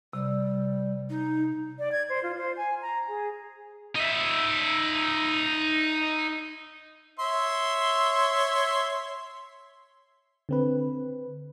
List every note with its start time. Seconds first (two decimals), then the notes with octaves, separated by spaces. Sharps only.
0.13 C3 G3
1.10 D#4
1.79 D5
1.92 G#6
2.09 C5
2.23 F4
2.38 C5
2.57 G#5
2.82 A#5
3.09 G#4
3.96 D#4 E5
7.19 C#5 E5 C6
10.49 D3 C4 B4